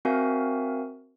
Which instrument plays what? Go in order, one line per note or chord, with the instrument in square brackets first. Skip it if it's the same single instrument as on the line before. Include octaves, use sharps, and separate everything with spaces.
[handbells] C4 F#4 A#4 E5 F5 G#5